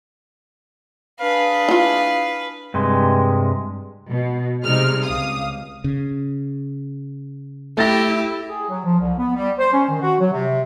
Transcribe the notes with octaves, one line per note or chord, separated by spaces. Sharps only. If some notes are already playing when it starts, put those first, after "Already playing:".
D4 G#4 B4 F5
E4 F4
G2 C3 G#3
B2
C3 G3 G#3 D#4 F6
C#2 F5 D#6
C#3
A3 E4 G4 A6 A#6
G#4
F#3
F3
C2
B3
G3
C5
C#4
D#3
F#4
F#3
C3